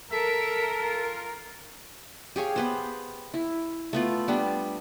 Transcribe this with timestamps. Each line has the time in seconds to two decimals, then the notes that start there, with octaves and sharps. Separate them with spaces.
0.12 A4 A#4 E5
0.83 F4
2.36 G4 G#4 C#5 F5
2.56 B3 B4 C5
3.34 E4
3.93 A3 B3 F4
4.28 G3 B3 D4